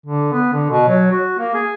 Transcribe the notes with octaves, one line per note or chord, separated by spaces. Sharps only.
D3
B3
D3
B2
F#3
F#4
A#3
G#4